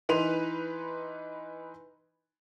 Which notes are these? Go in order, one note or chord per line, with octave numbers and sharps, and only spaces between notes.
E3 D#4 B4 C6 D#7 F7